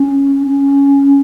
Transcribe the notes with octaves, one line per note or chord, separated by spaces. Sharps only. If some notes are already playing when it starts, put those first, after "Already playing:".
Already playing: C#4
C#4